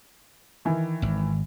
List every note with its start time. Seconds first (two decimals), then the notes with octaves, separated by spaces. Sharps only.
0.65 D#3 E3
1.02 G#1